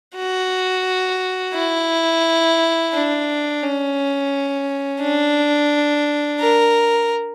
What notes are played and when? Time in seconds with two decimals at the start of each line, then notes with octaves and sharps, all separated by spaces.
0.16 F#4
1.55 E4
2.94 D4
3.63 C#4
5.01 D4
6.40 A#4